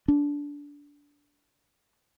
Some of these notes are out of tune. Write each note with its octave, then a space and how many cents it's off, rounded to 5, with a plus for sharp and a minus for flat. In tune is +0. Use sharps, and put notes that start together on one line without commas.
D4 -20